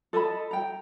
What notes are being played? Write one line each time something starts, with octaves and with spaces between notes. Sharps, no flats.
A4 D#5 A5 B5
G5 A#5